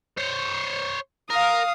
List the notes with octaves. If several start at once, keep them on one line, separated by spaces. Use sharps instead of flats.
C5 C#5
A#4 F5 D#6